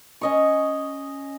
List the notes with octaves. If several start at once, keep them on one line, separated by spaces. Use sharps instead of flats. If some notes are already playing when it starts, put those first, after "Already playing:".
C#4 D#5 C#6